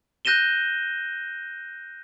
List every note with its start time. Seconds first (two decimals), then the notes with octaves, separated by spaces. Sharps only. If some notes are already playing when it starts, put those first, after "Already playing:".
0.25 F#6 G6 A#6 D#7 E7 G7